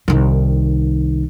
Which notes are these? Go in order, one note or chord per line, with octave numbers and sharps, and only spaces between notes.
C2 D#3